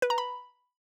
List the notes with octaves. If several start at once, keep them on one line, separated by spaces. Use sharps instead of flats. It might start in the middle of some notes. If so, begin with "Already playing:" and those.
B4
A#5
B5